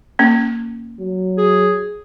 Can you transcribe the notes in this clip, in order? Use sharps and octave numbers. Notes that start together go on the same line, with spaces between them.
A#3 C#4
F#3
G#4